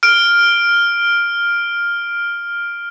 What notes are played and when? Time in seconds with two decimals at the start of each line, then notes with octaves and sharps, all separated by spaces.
0.03 F6 D7